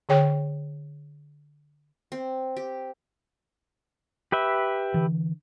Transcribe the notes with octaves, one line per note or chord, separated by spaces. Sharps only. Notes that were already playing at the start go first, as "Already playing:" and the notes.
D3 G#4 C#5 G5
C4
G4
G4 B4 E5
D3 E3